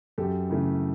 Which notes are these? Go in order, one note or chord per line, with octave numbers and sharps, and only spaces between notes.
F#2 G4 A4
C#3 E3 A3